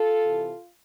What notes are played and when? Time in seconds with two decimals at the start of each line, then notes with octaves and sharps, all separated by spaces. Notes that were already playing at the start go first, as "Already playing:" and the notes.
Already playing: F4 A4
0.22 C3 E3